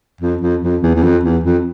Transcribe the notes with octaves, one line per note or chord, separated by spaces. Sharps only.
F2
F2
F2
E2
E2
F2
E2
F2